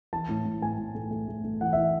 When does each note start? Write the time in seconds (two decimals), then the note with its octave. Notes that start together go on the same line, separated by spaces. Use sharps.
0.13 E3 A5
0.29 A2
0.45 A2
0.62 A2 G#5
0.78 A2
0.95 A3
1.11 A3
1.28 A3
1.44 A3
1.60 E3 F#5
1.73 E5
1.77 E3